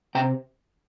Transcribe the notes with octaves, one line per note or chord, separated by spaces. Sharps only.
C3 G5 A#5